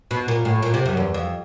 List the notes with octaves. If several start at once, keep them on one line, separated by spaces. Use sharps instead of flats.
B2
A#2
A2
A#2
C3
F#2
E2
F2